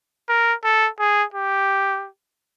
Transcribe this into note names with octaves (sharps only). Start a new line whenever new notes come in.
A#4
A4
G#4
G4